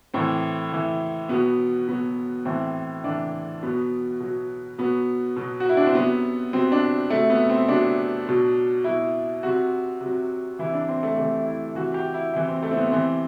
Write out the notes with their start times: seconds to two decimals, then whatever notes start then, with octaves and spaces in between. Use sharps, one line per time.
0.14 A2 E3 C4
0.72 A2 E3
1.29 B2 F#3 B3
1.88 B2 F#3 B3
2.45 A2 E3 C4
3.04 A2 E3 D4
3.62 B2 F#3 B3
4.20 B2 F#3
4.78 B2 F#3 B3
5.36 B2 F#3
5.60 F#4
5.69 E4
5.77 D4
5.87 C4
5.95 C3 F#3 B3
6.53 C3 F#3 C4
6.72 D4
7.10 C3 F#3 A3
7.30 B3
7.50 C4
7.68 C3 F#3 D4
8.27 B2 F#3
8.84 B2 F#3 E4
9.43 C3 F#3 F#4
10.01 C3 F#3
10.59 C3 E3 E4
10.74 D4
10.88 C4
11.03 A3
11.17 C3 E3 A3
11.46 E4
11.75 C3 E3 F#4
11.94 G4
12.14 E4
12.33 C3 E3 E4
12.48 C4
12.63 A3
12.71 C4
12.77 B3
12.91 C3 E3 C4